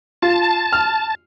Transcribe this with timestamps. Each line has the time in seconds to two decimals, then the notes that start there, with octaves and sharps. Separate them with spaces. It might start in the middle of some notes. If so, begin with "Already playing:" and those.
0.22 F4 A5
0.73 F6